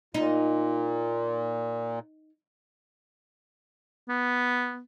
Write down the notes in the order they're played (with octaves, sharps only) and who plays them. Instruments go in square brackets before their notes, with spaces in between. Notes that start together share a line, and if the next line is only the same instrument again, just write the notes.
[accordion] A#2 [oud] D#4
[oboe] B3